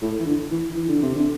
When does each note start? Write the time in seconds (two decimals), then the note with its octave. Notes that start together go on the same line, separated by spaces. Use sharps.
0.02 A2
0.20 E3
0.26 D3
0.51 E3
0.75 E3
0.88 D3
1.02 C3
1.15 D3